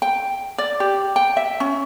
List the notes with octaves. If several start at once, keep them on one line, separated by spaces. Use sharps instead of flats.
G5
D5
G4
G5
E5
C#4